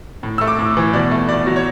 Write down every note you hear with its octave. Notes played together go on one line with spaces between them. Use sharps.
A2
A3 E6
D6
A2
E3
B2 D5
A3
B2 D5
F#3
C#5